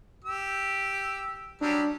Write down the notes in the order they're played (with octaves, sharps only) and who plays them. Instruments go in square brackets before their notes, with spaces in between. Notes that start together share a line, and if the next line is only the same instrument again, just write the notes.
[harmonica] G4 E6
[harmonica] F#3 G3 G4 [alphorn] D4